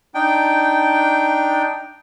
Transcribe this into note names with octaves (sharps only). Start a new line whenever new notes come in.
D4 D#4 G5